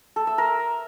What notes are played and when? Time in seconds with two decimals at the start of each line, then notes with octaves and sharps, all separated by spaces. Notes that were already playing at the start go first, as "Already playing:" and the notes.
0.16 A4
0.27 E5
0.38 A#4